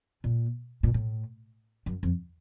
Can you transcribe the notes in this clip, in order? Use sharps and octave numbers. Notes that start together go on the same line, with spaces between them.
A#2
A#2
A2
F#2
F2